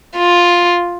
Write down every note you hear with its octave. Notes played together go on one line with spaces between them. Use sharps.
F4